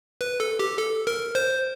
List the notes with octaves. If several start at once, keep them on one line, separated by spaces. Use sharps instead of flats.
B4
A4
G4
A4
A#4
C5